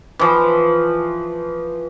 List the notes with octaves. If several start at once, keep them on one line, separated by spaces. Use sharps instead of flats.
E3 F3